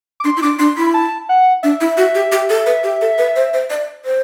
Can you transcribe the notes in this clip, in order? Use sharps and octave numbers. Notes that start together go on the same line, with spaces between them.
D6
D4 C6
E4
D4 D6
D4 C6
E4 B5
A5
F#5
D4 E5
E4
F#4
G4
G4
A4
B4
G4
A4
B4
C5
C5
D5
C5